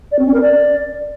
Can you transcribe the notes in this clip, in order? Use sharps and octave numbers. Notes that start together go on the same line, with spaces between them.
D5
C4
C#4
A#4
D5